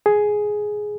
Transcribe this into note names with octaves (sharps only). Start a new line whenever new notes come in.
G#4